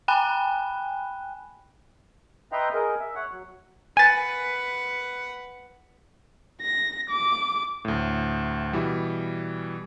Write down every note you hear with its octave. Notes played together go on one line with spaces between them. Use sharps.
G5 G#5 B5 F#6
B4 D#5 E5 G5 A#5 C6
G#4 A#4 D#5
E5
C#5 F#5
F#3
B4 F#5 G#5 A6
A#6
D6
D2 A2
B2 E3 G3